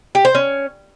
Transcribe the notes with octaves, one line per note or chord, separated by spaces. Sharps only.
G4
C5
C#4